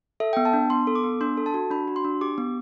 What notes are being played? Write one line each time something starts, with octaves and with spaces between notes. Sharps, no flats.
A4 E5
B3 G5
A5
D4
B3 C6
A4
D6
B3
D4 C6
A4
A5
F#4
D4 B5
F#4
C6
D4
G4 D6
B3